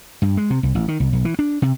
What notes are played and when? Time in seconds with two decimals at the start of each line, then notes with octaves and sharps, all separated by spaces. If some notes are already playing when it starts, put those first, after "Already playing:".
0.22 G2
0.37 G#3
0.50 C3
0.63 C2
0.75 A1
0.88 D#3
1.00 C2
1.13 B1
1.25 E3
1.39 D4
1.62 C3